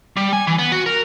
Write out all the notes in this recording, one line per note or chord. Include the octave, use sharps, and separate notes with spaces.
G3
G#5
E3
B3
F#4
A#4